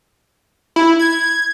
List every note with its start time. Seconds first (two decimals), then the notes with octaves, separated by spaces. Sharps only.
0.76 E4
0.99 G#6